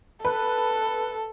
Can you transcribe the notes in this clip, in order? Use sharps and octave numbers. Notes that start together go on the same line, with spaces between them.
A4 B4